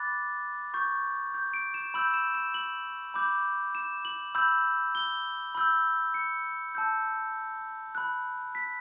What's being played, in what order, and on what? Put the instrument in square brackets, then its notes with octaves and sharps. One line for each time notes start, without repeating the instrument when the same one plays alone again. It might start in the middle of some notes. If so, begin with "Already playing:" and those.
Already playing: [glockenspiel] B5 D6 F#6 A6
C#6 G6
G6
D7
E7
B5 E6 G6 F#7
E7
E7
F#7
B5 D6 G6
E7
F#7
B5 E6 G6
G7
B5 E6 G6
C#7
A5 E6 G6
B5 F#6
B6